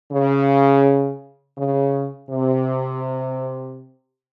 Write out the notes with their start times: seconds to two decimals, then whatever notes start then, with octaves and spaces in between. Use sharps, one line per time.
0.13 C#3
1.58 C#3
2.30 C3